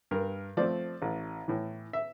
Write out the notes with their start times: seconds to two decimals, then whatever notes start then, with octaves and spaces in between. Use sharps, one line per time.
0.11 G2 A#4
0.57 F3 A3 C4 D5
1.02 A1
1.48 A2 E3
1.93 E5